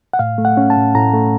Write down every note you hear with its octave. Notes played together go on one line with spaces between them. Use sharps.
F#5
A2 F5
A3
F#5
C#4
A5
A2
A2 A#5
A3